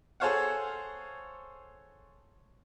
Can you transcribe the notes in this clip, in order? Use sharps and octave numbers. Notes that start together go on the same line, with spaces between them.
G#4 A4 C5 C#5 F5 F#5